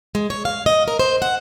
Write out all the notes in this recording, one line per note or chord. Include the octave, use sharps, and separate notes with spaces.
G#3
C#5
F5
D#5
A#4
C5
F#5